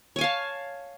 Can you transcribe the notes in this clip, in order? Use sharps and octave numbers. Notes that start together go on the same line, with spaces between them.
C#5 F5 G#5 A5